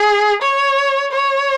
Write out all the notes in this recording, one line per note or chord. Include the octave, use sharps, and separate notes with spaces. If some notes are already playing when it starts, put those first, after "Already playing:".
Already playing: G#4
C#5
C#5